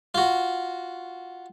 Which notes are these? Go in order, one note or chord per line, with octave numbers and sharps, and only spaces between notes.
F4 F#4